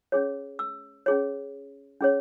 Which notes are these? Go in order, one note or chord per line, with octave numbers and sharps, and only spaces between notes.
C#4 G#4 C#5
E6
C#4 G#4 C#5
C#4 G#4 C#5